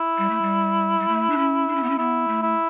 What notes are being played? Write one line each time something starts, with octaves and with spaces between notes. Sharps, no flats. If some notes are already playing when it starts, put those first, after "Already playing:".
Already playing: E4
G3
A3
G3
G3
A3
D4
C#4
D4
C#4
B3
C#4
B3 E4
A3
E4